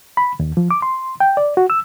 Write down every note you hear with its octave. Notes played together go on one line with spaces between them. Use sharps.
B5
D#2
F3
D6
C6
G5
D5
F#4
E6